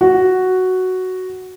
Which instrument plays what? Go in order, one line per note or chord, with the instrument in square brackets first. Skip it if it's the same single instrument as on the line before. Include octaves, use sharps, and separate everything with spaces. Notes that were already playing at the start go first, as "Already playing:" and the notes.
[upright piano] F#4